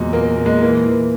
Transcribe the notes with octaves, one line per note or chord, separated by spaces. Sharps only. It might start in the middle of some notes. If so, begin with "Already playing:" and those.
Already playing: E2 A#2 F#3 G#3
A#2 A#3
A#2
G#3
E3 A#3
E3